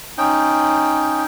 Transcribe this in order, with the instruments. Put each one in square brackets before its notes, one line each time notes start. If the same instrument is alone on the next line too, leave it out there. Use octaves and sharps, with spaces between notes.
[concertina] C#4 D#4 G5